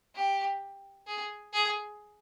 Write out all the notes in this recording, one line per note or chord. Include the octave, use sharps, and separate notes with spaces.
G4
G#4
G#4